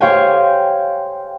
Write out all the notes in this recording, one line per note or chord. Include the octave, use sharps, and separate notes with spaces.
G4 C5 C#5 F5 G5 G#5